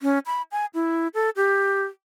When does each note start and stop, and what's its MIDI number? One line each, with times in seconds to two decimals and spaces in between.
0.02 0.19 61
0.26 0.42 83
0.52 0.66 80
0.74 1.08 64
1.14 1.30 69
1.36 1.84 67